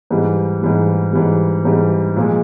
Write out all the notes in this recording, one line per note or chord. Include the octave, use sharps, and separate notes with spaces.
G#2 E3 G3
G#2 E3 G3
G#2 E3 G3
G#2 E3 G3
A#2 F3 G#3